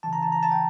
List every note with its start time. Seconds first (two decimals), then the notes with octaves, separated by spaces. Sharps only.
0.03 C#3 E3 A5
0.13 A#5
0.22 A5
0.32 A#5
0.43 A5
0.52 G5